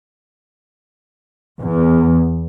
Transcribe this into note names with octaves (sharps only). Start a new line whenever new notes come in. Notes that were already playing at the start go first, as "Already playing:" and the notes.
E2